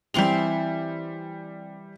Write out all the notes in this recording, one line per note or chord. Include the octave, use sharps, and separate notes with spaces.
E3 G3 C4 C6 F7